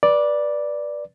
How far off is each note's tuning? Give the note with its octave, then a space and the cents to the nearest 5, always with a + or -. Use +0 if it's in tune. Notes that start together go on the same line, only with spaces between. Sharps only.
B4 -25 D5 +0